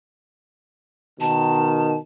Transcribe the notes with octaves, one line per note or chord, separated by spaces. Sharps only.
B2 D#3 A5